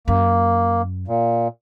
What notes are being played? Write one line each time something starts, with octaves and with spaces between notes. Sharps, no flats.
F#2 A#3
A#2